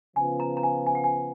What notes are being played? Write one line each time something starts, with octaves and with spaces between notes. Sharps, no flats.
C#3 F3 B3 F4 G#5
A#5
A#5
G#5
G#5
F#5
G#5